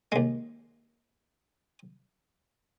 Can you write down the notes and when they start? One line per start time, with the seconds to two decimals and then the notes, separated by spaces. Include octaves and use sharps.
0.12 D#2 G#3